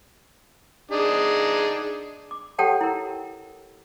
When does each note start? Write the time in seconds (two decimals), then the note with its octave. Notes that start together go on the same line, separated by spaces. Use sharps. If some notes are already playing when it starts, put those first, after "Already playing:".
0.91 D4 D#4 G#4
2.31 D6
2.58 G4 A4 C#5 F#5 G5 A5
2.81 E4 A#4